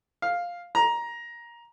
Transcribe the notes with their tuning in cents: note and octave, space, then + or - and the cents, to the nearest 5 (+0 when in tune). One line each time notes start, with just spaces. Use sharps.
F5 +5
A#5 +15